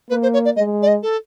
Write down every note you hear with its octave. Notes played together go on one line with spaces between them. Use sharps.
A#3 B4
C5
C#5
D5
G#3 D#5
D5
D#5
A4